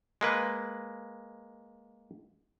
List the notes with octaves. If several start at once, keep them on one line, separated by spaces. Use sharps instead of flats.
G#3 A#3 B4